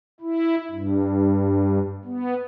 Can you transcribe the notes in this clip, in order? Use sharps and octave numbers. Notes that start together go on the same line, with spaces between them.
E4
G2
B3